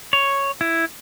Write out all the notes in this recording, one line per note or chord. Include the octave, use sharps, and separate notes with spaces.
C#5
E4